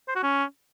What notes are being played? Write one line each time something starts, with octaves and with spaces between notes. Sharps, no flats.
C5
F#4
C#4